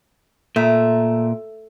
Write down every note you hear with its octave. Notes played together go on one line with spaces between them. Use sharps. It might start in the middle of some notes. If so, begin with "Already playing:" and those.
A#2 A3